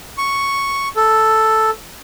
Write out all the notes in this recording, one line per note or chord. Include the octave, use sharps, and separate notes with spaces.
C#6
A4